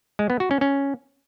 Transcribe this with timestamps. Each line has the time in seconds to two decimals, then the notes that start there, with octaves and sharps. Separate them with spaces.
0.19 G#3
0.30 B3
0.40 F#4
0.51 C#4
0.61 C#4